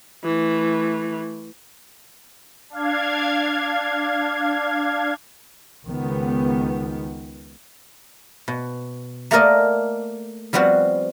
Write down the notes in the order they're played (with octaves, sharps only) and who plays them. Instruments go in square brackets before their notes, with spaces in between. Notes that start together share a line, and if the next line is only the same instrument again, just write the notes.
[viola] E3 A3
[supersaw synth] D4 F5 G#6
[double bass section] C#2 D#3 B3
[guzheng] B2
A3 A#3 A4 A#4 D5 D#5
F3 G3 B3 C4 F#4